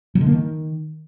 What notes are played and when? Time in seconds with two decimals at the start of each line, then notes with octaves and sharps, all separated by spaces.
0.15 F#3
0.21 D3
0.27 A#3
0.32 D#3